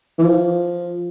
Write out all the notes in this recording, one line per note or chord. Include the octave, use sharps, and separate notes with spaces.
E3
F3